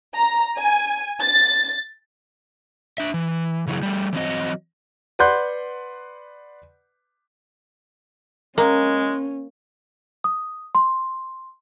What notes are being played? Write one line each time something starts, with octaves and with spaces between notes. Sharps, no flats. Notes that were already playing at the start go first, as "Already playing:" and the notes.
A#5
G#5
A6
D4 E5
E3
C#3 E3 F#3 G#4
G3 A3
E3 F#3 C4 D#5
B4 D5 F#5 C6 F#6 G6
G#3 A#3 C#4
D#6
C6